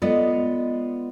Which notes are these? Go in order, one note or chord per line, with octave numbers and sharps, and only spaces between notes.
G#3 B3 F4 A4 D5 D#5